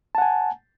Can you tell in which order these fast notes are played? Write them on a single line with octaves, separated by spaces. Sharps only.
A5 F#5 G#5